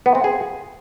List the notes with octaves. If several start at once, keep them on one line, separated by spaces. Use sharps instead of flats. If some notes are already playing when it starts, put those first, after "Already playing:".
B3
C4
G#4